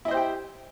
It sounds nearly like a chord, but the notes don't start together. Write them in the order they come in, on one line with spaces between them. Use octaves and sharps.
E4 D#5 C5 G4 G5